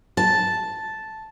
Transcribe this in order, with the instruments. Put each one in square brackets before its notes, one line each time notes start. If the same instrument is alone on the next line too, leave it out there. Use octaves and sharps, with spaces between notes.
[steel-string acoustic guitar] A5